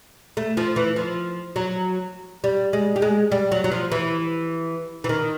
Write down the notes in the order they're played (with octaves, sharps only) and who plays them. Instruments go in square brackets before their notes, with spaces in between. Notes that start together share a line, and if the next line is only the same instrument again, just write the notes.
[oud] A3
F3
E3
F3
F#3
G3
G#3
G3
G#3
G3
F#3
F#3
F3
E3
E3
D#3